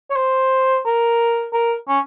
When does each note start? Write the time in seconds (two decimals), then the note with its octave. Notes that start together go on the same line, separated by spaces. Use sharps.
0.11 C#5
0.16 C5
0.86 A#4
1.54 A#4
1.88 C#4